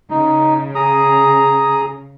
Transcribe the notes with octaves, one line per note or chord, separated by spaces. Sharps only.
C#3 D#4
G#4 A#5 D#6